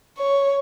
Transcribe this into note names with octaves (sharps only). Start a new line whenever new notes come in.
C#5